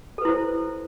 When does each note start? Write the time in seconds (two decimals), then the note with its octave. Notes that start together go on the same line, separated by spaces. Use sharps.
0.18 A4
0.22 B4
0.25 E4
0.29 C5